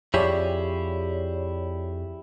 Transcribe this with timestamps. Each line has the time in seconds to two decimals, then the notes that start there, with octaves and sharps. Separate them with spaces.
0.14 F2 E4 G4 G#4 C#5 D5